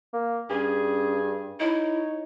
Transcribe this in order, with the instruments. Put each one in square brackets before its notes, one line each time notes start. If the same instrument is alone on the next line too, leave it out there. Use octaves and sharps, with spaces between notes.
[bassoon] A#3
[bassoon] G2 [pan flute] C#4 [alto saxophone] G#4
[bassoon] D#4 [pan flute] E4 [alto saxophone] C#5